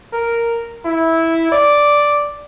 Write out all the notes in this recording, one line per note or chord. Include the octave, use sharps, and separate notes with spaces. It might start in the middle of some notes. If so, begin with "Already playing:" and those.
A#4
E4
D5